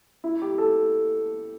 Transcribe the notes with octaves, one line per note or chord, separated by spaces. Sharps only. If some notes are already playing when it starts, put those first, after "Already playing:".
E4
G4
A4